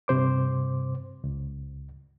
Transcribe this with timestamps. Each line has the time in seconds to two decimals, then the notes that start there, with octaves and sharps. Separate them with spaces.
0.08 G2 C3 C5 D6
1.24 C#2